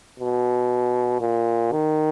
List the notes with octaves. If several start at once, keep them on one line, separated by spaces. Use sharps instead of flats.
B2
A#2
D#3